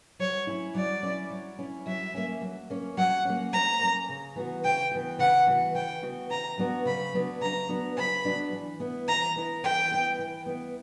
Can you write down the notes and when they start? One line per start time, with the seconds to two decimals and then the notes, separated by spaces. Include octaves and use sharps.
0.19 F#3 C#5
0.47 C#4 E4
0.75 F#3 D5
1.03 C#4 E4
1.30 F#3
1.58 C#4 E4
1.86 F#3 E5
2.14 A#3 C#4
2.41 F#3
2.70 A#3 C#4
2.97 F#3 F#5
3.25 A#3 C#4
3.52 F#3 A#5
3.80 A#3 C#4
4.09 C#3
4.36 E3 B3 F#4
4.64 C#3 G5
4.91 E3 B3 F#4
5.19 C#3 F#5
5.47 E3 B3 F#4
5.74 C#3 G5
6.02 E3 B3 F#4
6.30 C#3 A#5
6.58 F#3 B3 D4 F#4
6.85 C#3 B5
7.14 F#3 B3 D4 F#4
7.41 C#3 A#5
7.69 F#3 B3 D4 F#4
7.97 C#3 B5
8.25 F#3 B3 D4 F#4
8.52 E3
8.80 B3 E4
9.08 E3 A#5
9.36 B3 E4
9.63 E3 G5
9.91 B3 E4
10.19 E3
10.46 B3 E4